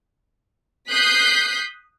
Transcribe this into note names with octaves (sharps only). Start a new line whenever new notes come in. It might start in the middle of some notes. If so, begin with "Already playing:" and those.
D#6 F#6 G6 B6 C7